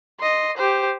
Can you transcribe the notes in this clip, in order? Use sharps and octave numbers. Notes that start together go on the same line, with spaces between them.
D#5 C6
G4 C5